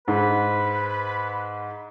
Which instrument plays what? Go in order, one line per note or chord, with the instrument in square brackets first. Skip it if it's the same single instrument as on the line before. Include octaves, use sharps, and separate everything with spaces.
[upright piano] G#2 [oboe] B4